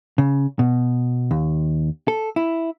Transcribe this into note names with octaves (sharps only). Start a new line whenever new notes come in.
C#3
B2
D#2
A4
E4